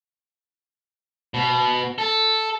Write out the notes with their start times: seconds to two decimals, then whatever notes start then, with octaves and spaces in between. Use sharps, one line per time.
1.34 B2
1.98 A4